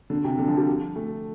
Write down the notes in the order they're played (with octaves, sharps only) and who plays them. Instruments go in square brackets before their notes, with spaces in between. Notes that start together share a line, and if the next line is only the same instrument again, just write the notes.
[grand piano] D3
C3
D3
F3
G3
A3